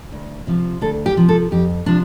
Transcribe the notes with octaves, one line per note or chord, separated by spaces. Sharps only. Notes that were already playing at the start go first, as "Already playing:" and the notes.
D2
C3 F3
D2 A4
G4
C3 F3
A4
F2 G4
C3 F3 D4